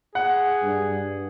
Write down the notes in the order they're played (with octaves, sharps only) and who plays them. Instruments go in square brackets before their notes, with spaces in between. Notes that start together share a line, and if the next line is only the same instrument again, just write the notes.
[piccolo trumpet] G#4 [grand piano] F#5
[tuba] G2